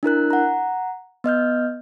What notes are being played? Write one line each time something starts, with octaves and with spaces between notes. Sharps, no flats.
D4 E4 A#4 F#6
F#5 A#5
B3 D#5 F6 G6